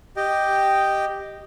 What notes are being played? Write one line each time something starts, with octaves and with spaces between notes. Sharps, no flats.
G4 D#5 G5